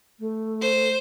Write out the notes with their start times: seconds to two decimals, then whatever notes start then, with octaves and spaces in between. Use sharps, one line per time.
0.19 A3
0.61 C5